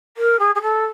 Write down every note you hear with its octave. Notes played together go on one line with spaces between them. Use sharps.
A#4
G#4
G#4
A4